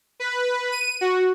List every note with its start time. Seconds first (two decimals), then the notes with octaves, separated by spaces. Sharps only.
0.20 B4
0.72 D#7
1.01 F#4